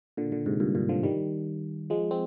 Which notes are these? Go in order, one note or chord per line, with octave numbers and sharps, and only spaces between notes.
A#2 D3
A#2 D3
G#2 C3
G2 A#2
G2 A#2
D3 F3
D#3 G3
F3 G#3
G#3 C4